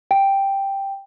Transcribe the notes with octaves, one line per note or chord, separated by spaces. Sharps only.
G5